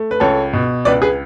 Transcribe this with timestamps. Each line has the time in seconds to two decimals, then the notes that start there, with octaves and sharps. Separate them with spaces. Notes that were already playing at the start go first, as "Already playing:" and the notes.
Already playing: A3
0.11 B4
0.20 C#2 A4 C#5
0.53 B2
0.85 C#2 B4 D5
1.02 G#4 B4